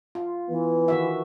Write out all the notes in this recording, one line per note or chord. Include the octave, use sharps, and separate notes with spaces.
F4
E3 B3
D#3 F#4 E5